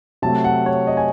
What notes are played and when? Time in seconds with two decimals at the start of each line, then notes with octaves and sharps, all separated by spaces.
0.22 C3 F#3 A3 A5
0.44 F#5
0.66 C#5
0.87 D#5
0.97 G#5